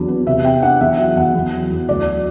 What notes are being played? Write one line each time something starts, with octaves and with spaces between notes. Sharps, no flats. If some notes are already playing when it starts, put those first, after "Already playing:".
Already playing: E2 F#3 D4
B3
C3 E5
B3 G5
D4 F#5
E2 E5
F#3 F#5
E2 F#5
E2
F#3
E2
D2 D5
F#3